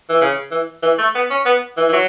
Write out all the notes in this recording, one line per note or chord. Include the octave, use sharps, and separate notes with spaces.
E3
C#3
E3
E3
A3
B3
C#4
B3
E3
E3
F#3